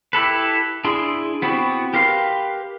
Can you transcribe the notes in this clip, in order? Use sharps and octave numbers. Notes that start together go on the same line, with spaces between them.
E4 G4 A4 B4
D4 E4 G#4 C6
B3 C4 E4 F#4 G4
G4 A#4 B4 F5 C6